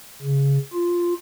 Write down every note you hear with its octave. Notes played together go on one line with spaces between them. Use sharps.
C#3
F4